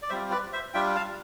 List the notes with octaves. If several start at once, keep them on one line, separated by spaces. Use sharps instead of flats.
D5
G3 C4 F4 C5 E5
B4 D5
C5 E5
G3 D4 F4 E5 G5
F5 A5